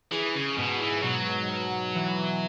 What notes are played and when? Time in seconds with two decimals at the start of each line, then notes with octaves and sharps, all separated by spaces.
0.11 E3 G#4
0.35 C#3
0.57 G#2 B2
0.80 E3
1.03 B2 F#3
1.49 B2
1.95 E3